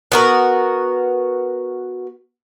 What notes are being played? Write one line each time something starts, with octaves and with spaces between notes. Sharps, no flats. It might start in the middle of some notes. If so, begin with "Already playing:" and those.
B3 F#4 A#4